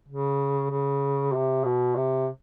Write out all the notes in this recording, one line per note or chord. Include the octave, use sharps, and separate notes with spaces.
C#3
C#3
C3
B2
C3